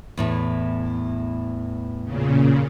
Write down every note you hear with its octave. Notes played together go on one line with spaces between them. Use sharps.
E2 A2 E3
A#2 C#3